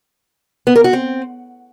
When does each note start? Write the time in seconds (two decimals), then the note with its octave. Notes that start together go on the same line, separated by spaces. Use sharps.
0.67 B3
0.76 A#4
0.84 F#4
0.93 C4